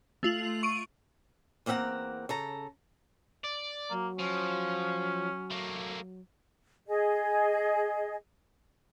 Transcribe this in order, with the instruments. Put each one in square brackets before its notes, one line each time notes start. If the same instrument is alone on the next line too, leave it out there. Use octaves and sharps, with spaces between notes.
[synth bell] A3 F4 F#7
C#6 D7 D#7
[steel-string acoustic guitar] E2 A#3 C4 E5 F#5 A#5
C#3 A4 A#5
[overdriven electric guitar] D5
[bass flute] F#3 [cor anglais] A#3
[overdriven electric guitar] F3 [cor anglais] C#4
[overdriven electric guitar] A3 A#3
[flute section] G#4 D#5